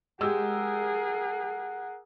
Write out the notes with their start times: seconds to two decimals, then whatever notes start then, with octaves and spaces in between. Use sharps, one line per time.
0.21 G#3 G4 G#4 A#4 F#5 E6